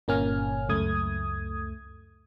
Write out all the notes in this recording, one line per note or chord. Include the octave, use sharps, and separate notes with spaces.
G1 A#2 A#3 C#4 G#5 F6
C#2 F#2 A3 D#6 G#6